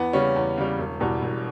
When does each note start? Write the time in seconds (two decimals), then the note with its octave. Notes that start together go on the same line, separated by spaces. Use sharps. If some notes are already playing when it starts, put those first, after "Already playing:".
Already playing: E2 B3
0.13 C#3 G3 C#4
0.36 E2
0.57 C#3 G3
0.79 E1
1.00 E2 B2 G3
1.22 E1